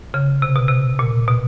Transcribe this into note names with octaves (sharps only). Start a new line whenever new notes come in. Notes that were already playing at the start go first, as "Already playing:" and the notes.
C#3
C3
B2
C3
A#2
B2